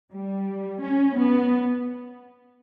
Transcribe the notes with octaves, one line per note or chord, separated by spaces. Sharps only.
G3
C#4
B3